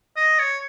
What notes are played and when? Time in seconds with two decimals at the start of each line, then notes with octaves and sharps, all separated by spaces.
0.17 D#5
0.39 C#5